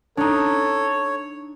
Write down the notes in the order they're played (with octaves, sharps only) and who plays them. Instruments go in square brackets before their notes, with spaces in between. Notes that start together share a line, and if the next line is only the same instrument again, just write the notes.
[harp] D4 D#4 [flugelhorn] A4 [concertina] C#5